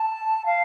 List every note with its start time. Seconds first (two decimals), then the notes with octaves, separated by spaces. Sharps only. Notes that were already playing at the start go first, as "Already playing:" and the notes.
Already playing: A5
0.46 F5